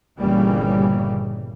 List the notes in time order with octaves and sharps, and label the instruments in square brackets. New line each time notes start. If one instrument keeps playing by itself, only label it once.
[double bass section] G1 A#2 C#3 E3 G3 A#3